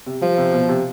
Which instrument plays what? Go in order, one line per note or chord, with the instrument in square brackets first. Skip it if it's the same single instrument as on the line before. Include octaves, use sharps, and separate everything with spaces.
[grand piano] C3
[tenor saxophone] F3 [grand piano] G3
[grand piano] C3
B2
C3